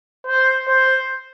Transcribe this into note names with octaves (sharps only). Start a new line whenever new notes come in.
C5
C5